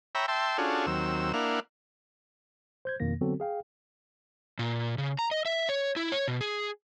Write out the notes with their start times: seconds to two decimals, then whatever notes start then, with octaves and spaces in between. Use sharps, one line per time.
0.15 C#5 E5 G5 A#5 B5
0.28 E5 G5 A5 C6
0.58 C#4 D4 F4 F#4 G#4 A4
0.86 D#2 F#3 C4 E6
1.33 A#3 D4 E4 F5 F#5
2.85 C5 G6 G#6
3.00 F2 B2 D#3 A#3 A#6
3.21 D3 F#3 B3 C4 F#4 A4
3.40 G#4 F5 G5
4.59 A#2
4.98 C#3
5.19 A#5
5.31 D#5
5.46 E5
5.69 C#5
5.96 E4
6.12 C#5
6.28 B2
6.41 G#4